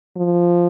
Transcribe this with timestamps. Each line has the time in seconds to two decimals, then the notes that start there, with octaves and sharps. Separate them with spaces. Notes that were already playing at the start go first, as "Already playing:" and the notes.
0.17 F3